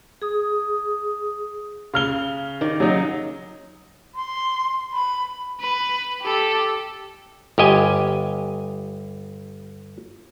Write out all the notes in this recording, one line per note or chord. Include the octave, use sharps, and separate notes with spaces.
G#4 D#6
C#3 F6 G7
D#3 D5
C#3 F#3 D#4
C6
B5
B4
G4 A4
G1 G4 D#5 G#5